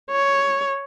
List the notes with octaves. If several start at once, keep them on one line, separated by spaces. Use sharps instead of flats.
C#5